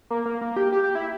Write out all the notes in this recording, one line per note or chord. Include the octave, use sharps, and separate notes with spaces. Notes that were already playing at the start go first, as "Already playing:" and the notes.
A#3
A#3
A#3
G4
G4
G4
E4